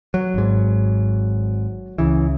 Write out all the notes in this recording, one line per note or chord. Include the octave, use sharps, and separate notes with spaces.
F#3
G#1 G#2
C#2 C#3 E3